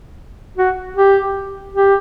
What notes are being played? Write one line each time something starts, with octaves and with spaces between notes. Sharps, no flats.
F#4
G4
G4